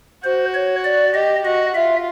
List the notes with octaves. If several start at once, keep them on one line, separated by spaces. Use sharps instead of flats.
F#4 C5
C#5
D5
G4 D#5
F#4 D#5
F4 E5